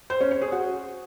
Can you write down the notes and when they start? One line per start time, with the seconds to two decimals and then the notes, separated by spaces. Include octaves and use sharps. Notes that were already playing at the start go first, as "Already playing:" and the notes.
0.10 C5
0.20 C#4
0.31 C#5
0.42 G#4
0.52 F#4